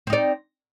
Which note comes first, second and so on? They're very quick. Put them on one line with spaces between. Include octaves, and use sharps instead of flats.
C4 D#4 D5